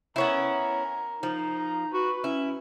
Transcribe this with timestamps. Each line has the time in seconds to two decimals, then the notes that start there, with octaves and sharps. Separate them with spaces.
0.16 B3 C#4 E4 A#4
1.23 F3 D#4
1.56 A#5
1.93 F#4 B4
2.24 C#4 E4